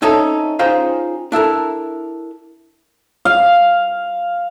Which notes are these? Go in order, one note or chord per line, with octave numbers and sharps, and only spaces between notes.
C4 C#4 D#4 A4 C#5 E5
C#4 D#4 F4 G#4 C5 G5
D4 E4 A4 A#4
F5